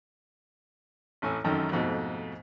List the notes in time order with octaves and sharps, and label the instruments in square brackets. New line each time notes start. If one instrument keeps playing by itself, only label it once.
[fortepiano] A1 A2 G#5 E6
A1 F#2 D#3 A4 G5 A#5
F2 G#2 B2 A3